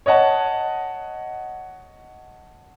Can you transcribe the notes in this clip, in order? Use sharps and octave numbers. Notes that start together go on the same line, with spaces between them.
C#5 D#5 F#5 A5